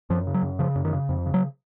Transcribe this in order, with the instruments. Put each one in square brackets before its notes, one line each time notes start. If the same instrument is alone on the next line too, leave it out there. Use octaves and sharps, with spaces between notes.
[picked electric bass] F#2 F3
C#3
F#3
F#2
C#3 F3
F#2
D#3
C#3
F2
C#3
F#3